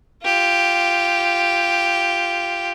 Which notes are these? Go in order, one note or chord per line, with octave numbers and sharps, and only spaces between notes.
F4 G4